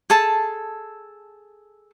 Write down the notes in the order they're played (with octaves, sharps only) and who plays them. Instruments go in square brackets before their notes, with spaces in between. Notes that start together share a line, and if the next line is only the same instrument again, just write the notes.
[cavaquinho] G#4 A4 A5